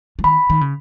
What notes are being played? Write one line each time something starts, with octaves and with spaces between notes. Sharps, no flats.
F3
D#3 B5
D#3
C#3